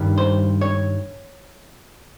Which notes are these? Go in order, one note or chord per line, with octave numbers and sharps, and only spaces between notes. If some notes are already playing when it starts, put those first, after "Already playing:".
Already playing: G2 D#3 G3
C5
C#5